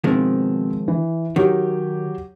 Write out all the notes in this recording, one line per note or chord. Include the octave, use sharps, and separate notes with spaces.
B2 D#3 F3 G#3 C4
E3
D#3 F#3 G4 C#5